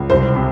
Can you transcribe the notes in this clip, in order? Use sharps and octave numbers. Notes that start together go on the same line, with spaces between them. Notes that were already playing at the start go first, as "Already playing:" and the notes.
Already playing: C#2
C2 C5
C3